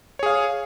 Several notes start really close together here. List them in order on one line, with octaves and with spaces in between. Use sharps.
C#5 G#4 F5